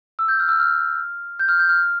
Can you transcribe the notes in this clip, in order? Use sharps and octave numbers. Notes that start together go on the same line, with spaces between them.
E6
G6
F6
E6
F6
G6
F6
G6
F6